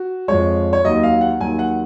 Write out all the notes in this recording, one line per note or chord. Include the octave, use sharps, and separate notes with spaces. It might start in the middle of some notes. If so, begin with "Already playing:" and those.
Already playing: F#4
F2 F3 G#3 C#5
C#5
D#2 D#3 F#3 D#5
F5
F#5
D#2 D#3 F#3 G#5
F#5